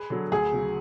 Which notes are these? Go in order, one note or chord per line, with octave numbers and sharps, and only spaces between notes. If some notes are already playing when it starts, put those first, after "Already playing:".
Already playing: G#4 B4
D3 F#3
D2 G#4
C#3 F#3